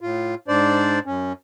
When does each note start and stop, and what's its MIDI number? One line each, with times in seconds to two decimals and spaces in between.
0.01 0.35 45
0.01 0.35 65
0.48 0.99 44
0.48 0.99 62
0.48 0.99 72
0.48 0.99 74
1.06 1.33 42
1.06 1.33 61